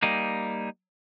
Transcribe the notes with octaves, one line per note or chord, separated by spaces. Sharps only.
G3 A#3 D#4